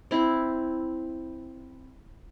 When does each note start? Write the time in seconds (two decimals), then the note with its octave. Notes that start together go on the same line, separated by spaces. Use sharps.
0.11 C4 E4